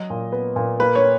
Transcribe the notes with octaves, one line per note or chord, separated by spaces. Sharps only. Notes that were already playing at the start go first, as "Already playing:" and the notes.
Already playing: F#3 D#5
A#2
B3
A#2
A#3 B4
C#5